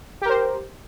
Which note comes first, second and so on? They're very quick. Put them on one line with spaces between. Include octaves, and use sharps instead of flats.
G4 A#4 C5